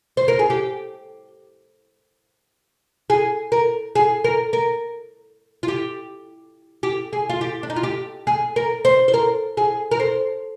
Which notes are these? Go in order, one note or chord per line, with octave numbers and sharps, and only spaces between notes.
C5
A#4
G#4
G4
G#4
A#4
G#4
A#4
A#4
F4
G4
G4
G#4
F4
G4
D4
D#4
F4
G4
G#4
A#4
C5
C5
A#4
G#4
A#4
C5